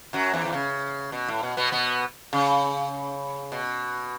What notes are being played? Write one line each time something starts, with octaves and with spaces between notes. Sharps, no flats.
F#2 F#3
E2 E3
E3
C#3
B2
A2
B2
B2 B3
B2 B3
C#3
B2